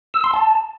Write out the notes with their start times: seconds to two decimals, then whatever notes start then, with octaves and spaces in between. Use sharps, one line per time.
0.14 E6
0.24 C6
0.34 A5